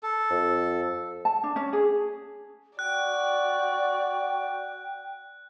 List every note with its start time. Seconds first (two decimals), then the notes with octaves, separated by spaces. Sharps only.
0.03 A4
0.30 F2
1.25 A5
1.44 D4
1.56 C#4
1.73 G#4
2.79 F#4 D5 G5 F#6